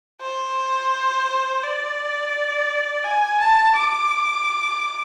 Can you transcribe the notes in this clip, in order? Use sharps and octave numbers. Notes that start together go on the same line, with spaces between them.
C5
D5
G#5
A5
D6